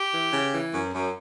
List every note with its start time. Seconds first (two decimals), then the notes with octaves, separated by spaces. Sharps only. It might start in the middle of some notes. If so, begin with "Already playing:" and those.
Already playing: G4
0.12 E3
0.32 C#3
0.53 E3
0.73 F#2
0.94 F#2